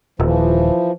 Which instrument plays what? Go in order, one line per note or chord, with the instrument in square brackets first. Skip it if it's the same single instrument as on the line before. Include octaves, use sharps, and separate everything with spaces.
[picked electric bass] D#1 [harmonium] E3 F3